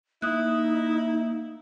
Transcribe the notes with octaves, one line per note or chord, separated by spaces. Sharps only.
A#3 D#4 E4 D#6 F#6